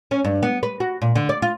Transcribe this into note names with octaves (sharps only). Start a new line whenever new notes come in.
C#4
G2
B3
B4
F#4
A#2
D3
D5
F4